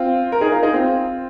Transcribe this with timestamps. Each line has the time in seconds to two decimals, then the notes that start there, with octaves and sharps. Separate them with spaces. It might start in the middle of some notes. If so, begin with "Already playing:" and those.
Already playing: C4 F4
0.32 A#4
0.41 D#4 G#4
0.52 F4 A#4
0.63 D#4 G#4
0.74 C4 F4